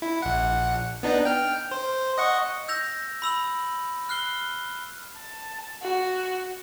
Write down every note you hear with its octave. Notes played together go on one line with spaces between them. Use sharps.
E4
A#1 F#5
B3 D4 D#4
G5 F6
C5
D#5 F#5 C#6
E6 G6 A#6 F7
B5 E6 F7 F#7
F6 F#6 C7 G7
A5
F#4